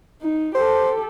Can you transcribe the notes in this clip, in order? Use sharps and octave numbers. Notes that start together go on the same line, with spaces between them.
D#4
G4 A4 C5